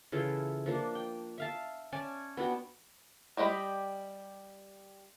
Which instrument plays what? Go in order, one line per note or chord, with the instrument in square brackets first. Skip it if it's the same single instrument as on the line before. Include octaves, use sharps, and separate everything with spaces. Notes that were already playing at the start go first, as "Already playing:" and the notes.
[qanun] C#3 E3 F4 A4
F3 A#3 D4
G5
E5 F5 A5
C#4 D5 G#5 A5
B3 D4 F#4 G5
[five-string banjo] G3 G4 D#5 F#5 B5